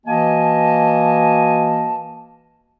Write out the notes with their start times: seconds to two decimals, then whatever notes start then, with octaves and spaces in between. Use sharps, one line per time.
0.06 E3 A#3 F#4 D#5 G#5 A5